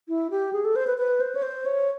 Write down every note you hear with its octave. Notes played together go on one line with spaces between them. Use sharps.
E4
G4
G#4
A4
C5
B4
B4
C5
C#5
C5
C#5